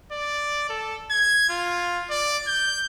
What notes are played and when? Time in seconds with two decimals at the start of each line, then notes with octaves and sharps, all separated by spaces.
0.12 D5
0.69 A4
1.11 G#6
1.49 F4
2.10 D5
2.47 G6